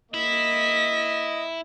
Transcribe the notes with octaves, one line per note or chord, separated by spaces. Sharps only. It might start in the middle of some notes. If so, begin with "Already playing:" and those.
A#3 E4 D#5 B6